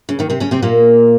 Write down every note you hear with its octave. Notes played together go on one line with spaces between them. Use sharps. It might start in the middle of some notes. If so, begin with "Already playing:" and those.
C#3
D#2 D#3
C3 C4
C#3 C#4
C3 C4
A#2 A#3